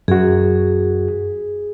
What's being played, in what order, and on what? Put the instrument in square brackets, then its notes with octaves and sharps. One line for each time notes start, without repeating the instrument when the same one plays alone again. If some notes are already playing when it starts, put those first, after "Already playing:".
[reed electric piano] F#2 F#4 [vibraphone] G#4